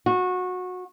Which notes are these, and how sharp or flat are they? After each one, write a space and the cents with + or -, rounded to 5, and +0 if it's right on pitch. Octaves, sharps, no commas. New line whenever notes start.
F#4 -20